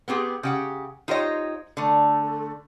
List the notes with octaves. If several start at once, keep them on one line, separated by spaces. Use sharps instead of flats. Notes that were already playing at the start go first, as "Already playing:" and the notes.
B3 C4 G4 G#4
C#3 G4 F#5
D#4 F4 G4 C5 C#5 D#5
D3 A3